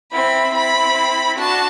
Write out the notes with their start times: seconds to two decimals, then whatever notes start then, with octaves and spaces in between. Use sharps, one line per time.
0.12 C4 E4 B5
0.54 C4 E4 B5
1.39 D4 F#4 A5